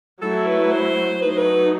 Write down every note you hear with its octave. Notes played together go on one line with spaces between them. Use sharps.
F#3 A3 E4 A4
B4
C5
F#3 A3 D#4 B4
C5
B4